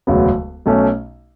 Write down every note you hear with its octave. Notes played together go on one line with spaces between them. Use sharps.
E1 D2 C#3 F#3 B3
B1 B2 A3 C#4